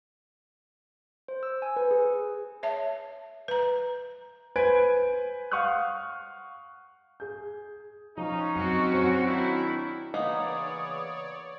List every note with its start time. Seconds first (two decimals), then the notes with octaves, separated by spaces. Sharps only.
1.28 C5
1.43 E6
1.62 G#5
1.76 B4
1.91 G#4
2.63 C#5 E5 A5
3.48 B4 A#5
4.56 B4 C5 G#5 G#6 D7
5.52 F5 F#5 C#6 D#6 F6 F#6
7.20 G#4 G6
8.17 F3 C#4 D#4
8.55 F#2 C4 F#4
8.93 F#3 C5 C#7
9.27 D#3 D4 E4
10.14 C#3 E3 A#3 B3 D#4 C#5 D5 D#6